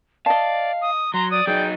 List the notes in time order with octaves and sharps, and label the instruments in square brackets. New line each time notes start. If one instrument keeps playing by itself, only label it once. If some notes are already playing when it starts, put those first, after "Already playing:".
[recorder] D5 [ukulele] D#5 A5 [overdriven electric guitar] F5
[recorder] D#6
[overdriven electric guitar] F#3 [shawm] A#5 [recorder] C6
[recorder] D5 [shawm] D#6
[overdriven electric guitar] F#3 D#4 [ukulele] G#4 [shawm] G5